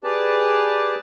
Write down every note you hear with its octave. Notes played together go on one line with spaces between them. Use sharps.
G4 G#4 B4 D5 A5